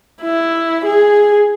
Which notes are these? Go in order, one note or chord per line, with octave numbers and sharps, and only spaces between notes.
E4
G#4